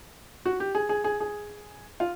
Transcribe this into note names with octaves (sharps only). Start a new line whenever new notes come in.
F#4
G4
G#4
G#4
G#4
G#4
F4